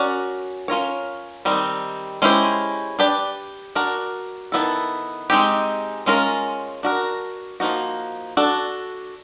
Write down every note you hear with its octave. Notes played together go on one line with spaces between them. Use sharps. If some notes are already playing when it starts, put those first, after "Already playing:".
Already playing: C#4 F#4 A#4 D5
C#4 F4 A#4 C#5
D#3 G3 C4 D#4
G#3 C#4 E4 G4 C5
D4 G4 B4 D5
D4 F#4 A#4 D5
D#3 G3 B3 E4 A4
G#3 C4 D#4 G4
G#3 C#4 F4 A#4
D4 F#4 A#4
F3 A#3 D#4 F#4
D4 F#4 A4